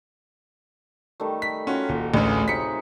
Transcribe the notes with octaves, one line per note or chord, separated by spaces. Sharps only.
D#3 G3 A3
B6
C#4 F4 F#4 A#4
D#1
A1 D2 G#3 C#4 G#4
C3 D#4 B6 C#7